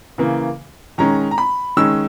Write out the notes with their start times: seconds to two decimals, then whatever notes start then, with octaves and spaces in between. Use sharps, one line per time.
0.18 C#3 E3 A#3
0.98 D#3 G#3 C#4 A#5
1.31 A#5
1.38 B5
1.77 D#3 G#3 C#4 E6